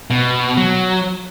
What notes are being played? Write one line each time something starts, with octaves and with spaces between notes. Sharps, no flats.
B2
F#3